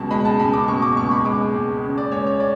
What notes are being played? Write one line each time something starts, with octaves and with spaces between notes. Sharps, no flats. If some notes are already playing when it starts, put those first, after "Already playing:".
Already playing: C#2 B2 A5
G#3 B5
A5
C#2 B5
D6
B2 C#6
D6
C#2 C#6
B5
G#3 D6
C#2
C#3
D5
C#2 C#5
C#5
D5